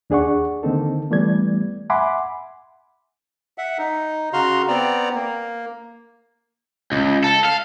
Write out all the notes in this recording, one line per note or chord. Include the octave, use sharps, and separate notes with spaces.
D#2 D4 G#4 D5 F#5 C#6
D3 D#3 A#3 C4 D#4 A4
E3 G3 A3 B3 D5 G#6
E5 F#5 G#5 B5 C6 D6
E5 F#5
D#4
C#3 F#4 F5 A#5 C6
B3 C4 D5 A#5
A#3
C#2
A4
F5